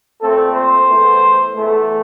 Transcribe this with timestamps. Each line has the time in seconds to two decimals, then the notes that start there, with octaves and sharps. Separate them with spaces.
0.21 A#2 A3 C4 A4
0.54 C5
0.89 E2 E3 A3
1.56 E2 E3 A3